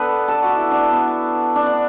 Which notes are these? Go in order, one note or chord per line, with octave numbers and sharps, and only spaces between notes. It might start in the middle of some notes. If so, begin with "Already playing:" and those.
Already playing: B3 D4 A4 B4
A4
F#4
E4
D4
B3
D4
D4